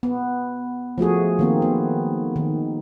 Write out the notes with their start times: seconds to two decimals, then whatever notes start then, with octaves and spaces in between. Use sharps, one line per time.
0.03 B3
0.98 F3 A3 F#4 G#4
1.39 D#3 A#3 C4
1.62 B3
2.36 D#3